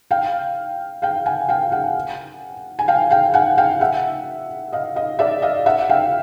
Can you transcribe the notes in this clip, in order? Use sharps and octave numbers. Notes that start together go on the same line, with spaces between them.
F5 G5
F5 G5
F#5 G#5
F5 G5
F#5 G#5
G#5
F5 G5
F5 G5
F#5 G#5
F5 G5
E5 F#5
D#5 F5
D#5 F5
D5 E5
D#5 F5
E5 F#5
F5 G5